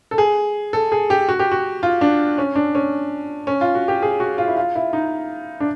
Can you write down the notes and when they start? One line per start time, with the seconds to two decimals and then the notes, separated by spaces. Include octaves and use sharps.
0.11 A4
0.18 G#4
0.73 A4
0.92 G#4
1.10 G4
1.29 F#4
1.39 G4
1.52 F#4
1.83 F4
2.01 D4
2.38 C#4
2.55 D4
2.75 C#4
3.47 C#4
3.61 F4
3.75 F#4
3.88 G4
4.02 G#4
4.20 F#4
4.38 F4
4.48 E4
4.57 F4
4.75 E4
4.93 D#4
5.60 D4